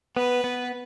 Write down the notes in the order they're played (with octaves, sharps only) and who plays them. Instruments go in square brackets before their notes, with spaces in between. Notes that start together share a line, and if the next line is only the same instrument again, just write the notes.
[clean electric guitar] B3 [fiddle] B4
[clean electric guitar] B3